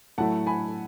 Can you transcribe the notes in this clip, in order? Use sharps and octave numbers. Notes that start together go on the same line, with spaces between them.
A2 F#3 A3 E4 F#5 A5
G#5 B5